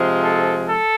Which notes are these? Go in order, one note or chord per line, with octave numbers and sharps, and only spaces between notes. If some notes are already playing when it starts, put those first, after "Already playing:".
Already playing: C3 F3 G#3
A4
A4